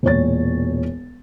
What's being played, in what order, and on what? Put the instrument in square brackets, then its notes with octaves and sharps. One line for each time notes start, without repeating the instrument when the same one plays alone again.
[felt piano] E1 A#2 C#5 A6